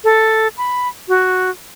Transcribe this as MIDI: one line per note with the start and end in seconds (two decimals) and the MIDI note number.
0.04 0.48 69
0.58 0.88 83
1.08 1.50 66